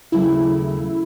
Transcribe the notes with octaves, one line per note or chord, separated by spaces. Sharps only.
D#2 C#3 F#3 A3 E4